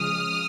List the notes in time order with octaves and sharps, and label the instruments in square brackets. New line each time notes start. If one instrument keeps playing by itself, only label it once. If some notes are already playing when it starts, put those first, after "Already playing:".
Already playing: [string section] C#3 F3 G#3 D#6 F6